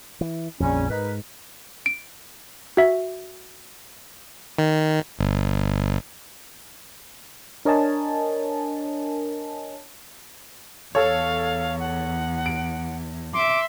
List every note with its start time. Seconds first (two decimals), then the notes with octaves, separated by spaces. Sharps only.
0.21 E3
0.60 A#1 F2 C#3 G3 C#4
0.90 G#2 D#4 A#4 B4
1.86 D7
2.77 F#4 E5
4.59 D#3
5.19 G1
7.65 D4 A#4 C#5 D#5 G#5 A5
10.95 E2 A4 C#5 F5
11.80 F#5
12.46 D7
13.34 E5 C6 D6